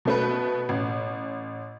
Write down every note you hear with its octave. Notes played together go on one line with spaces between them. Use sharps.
B2 A3 B4
A1